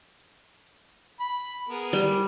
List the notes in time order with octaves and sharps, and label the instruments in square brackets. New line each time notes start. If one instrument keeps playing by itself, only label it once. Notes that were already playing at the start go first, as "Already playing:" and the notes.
[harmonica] B5
B3 G#4 A#4
[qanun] G3